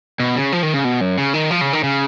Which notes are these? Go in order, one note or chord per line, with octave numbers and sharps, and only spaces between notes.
B2
C#3
F3
D#3
C#3
B2
F#2
C#3
D#3
F3
C#3
D#3
C#3